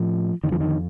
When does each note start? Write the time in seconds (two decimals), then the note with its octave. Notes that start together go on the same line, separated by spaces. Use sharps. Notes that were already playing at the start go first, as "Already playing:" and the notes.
Already playing: A2 F3
0.44 F2 D3 D#3
0.52 F3
0.60 D#3